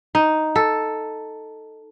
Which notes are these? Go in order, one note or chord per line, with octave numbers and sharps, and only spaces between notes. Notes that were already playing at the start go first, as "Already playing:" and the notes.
D#4
A4